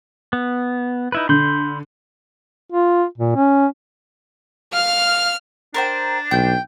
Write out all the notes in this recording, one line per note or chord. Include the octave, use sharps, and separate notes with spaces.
B3
D#4 E4 B4
D3 B5 C6 G6
F4
A#2
C#4
F5 F6
D4 A#4 C5 G5
B1 G5 G6